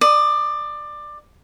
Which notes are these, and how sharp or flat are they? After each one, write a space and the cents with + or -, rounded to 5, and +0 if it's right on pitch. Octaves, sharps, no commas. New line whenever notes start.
D5 +20 D#6 +0